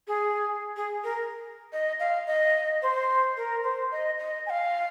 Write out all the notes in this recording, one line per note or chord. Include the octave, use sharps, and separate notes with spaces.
G#4
G#4
A#4
D#5
F5
D#5
C5
A#4
C5
D#5
D#5
G#5
F5